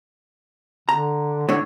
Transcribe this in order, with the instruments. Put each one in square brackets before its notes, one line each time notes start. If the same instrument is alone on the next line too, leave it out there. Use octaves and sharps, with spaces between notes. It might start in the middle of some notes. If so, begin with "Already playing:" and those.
[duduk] D3 [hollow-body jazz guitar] A#5
[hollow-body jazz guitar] A2 D3 [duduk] C#5